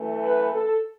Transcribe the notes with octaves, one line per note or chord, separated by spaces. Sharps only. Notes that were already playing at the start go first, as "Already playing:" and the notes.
Already playing: F#2 E3 A3
B4
A4